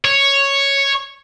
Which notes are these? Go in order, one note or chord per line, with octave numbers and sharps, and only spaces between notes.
C#5